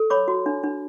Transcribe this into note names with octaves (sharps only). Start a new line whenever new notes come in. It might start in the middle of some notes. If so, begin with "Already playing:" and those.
Already playing: A4
C#5 B5 D6
F#4
D4
D4